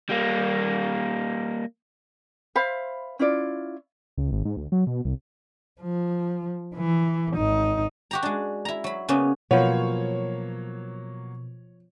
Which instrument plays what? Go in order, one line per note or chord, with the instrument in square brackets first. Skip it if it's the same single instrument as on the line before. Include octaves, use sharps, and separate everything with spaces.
[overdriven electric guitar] G3 A#3
[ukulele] C5 E5 F5 B5
C#4 E4 F4 D5
[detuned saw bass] C#2
G#1
G#2
D2
F#3
B2
C2
[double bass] F3
E3
G#1 D#4
[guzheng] F#4 G4 A#5
G#3 D4
E4 A#5
F#3 B5
C#3 A#3 B3 C#4
[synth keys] B2 [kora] F3 B3 [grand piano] F#3 A#3 [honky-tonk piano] C#5